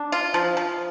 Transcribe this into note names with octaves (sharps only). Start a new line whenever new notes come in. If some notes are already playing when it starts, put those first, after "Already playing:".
Already playing: D4
F4
F3
F3